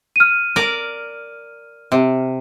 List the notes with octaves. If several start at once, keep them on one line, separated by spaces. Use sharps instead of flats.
F6 D#7
A#4 D5
C3